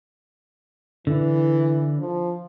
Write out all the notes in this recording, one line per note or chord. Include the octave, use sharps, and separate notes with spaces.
D3 E3
F3